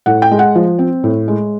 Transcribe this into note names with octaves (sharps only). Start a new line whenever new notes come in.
A2 F#5
G5
G#3
F#5
F3
C4
A2
G#3